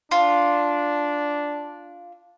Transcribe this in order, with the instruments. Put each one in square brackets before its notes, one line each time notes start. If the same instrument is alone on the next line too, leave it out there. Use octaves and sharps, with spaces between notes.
[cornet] D4 [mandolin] F4